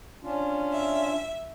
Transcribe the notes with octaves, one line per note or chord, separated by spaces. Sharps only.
C#4 D4 F4
E5